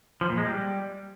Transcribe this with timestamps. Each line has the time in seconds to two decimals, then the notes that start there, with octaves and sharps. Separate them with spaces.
0.21 F3
0.29 A#2
0.38 G#3
0.46 G3